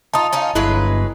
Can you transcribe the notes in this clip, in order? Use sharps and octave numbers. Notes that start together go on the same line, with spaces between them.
D#4 F4 A5 D#6
C#4 D#4 F4
G1 F#3 G#3 E4 B4